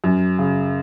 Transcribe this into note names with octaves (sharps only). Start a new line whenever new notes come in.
F#2
C#3